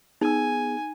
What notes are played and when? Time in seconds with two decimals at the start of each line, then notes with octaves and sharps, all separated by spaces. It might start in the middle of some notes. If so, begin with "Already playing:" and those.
0.21 B3 D#4 G#4 G#5 E6